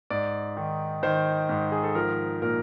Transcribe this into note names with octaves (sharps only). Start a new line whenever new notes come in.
G#2 D5
D#3
D#3 C5
G#2
G#4
A4
F3 A#4
A#2 A#4